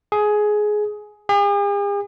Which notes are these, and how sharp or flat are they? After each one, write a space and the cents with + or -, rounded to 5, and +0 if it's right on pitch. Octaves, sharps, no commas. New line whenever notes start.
G#4 +15
G#4 -45